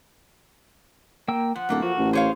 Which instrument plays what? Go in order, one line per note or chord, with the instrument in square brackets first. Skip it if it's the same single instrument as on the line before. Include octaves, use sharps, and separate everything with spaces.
[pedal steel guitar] A#3 G5 E6
[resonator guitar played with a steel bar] F3 [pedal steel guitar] F#5
[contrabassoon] D1 [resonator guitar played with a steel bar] F#2 A#3 A4
[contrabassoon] F3 [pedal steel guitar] F#4
[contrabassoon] A1
[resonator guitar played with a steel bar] G#4 C#5 F5 [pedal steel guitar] C5